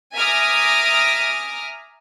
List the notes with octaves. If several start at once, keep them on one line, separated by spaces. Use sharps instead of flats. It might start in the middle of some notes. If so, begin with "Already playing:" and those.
E5 G#5 A#5 D6 D#6 F6